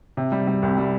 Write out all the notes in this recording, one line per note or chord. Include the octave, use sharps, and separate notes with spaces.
C3
G3
G3
C2
G3